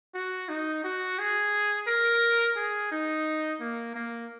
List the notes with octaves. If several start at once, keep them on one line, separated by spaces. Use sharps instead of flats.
F#4
D#4
F#4
G#4
A#4
G#4
D#4
A#3
A#3